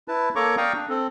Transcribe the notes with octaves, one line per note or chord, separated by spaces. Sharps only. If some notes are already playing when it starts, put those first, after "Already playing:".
E4 B4 A5
A#3 A4 C#5 A#5 C#6 D6
D5 F5 G5 A#5 C#6 D#6
D4
C4 A4